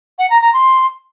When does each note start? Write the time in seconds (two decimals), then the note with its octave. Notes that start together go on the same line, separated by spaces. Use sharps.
0.19 F#5
0.30 A#5
0.42 A#5
0.53 C6